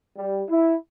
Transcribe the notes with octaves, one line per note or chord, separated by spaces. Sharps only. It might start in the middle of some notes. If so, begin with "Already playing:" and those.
G3
E4